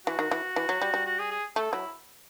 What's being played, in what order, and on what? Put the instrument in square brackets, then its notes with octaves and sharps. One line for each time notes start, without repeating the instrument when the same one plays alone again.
[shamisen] E3 [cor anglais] F#4
[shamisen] D#3
E3
E3
F#3
G3
G3
[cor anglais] F#4
G#4
G#4
[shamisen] A3 [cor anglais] A4
[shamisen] F#3 [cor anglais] E4